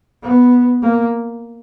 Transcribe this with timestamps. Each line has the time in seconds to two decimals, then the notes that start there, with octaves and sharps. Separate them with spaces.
0.23 B3
0.82 A#3